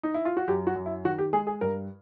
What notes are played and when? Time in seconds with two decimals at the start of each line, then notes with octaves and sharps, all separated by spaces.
0.03 D#4
0.14 E4
0.25 F4
0.37 F#4
0.48 F#2 G4
0.67 F#4
0.76 F#2
0.86 E4
1.04 D#3 F#4
1.18 G4
1.33 G#3 G#4
1.47 G#4
1.61 G2 A#4